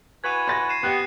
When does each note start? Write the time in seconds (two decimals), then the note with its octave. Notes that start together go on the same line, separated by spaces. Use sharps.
0.24 E3 F#4 B4 G#6 D#7 E7
0.48 C6 A6 A#6
0.69 C7 D#7 E7
0.83 B3 G4 G5 D#6 F#6